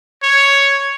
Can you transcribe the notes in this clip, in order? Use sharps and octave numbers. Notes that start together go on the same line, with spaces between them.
C#5